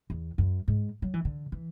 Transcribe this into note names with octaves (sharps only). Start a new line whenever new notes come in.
E2
F#2
G#2
F#3
E3
D3
E3